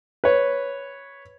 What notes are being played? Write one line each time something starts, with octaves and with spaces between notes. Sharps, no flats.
B4 C#5